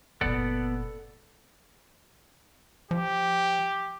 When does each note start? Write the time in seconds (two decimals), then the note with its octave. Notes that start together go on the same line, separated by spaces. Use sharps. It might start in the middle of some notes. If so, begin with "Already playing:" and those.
0.21 F#1 A#2 B3 A4 D5 F#5
2.91 F3 G4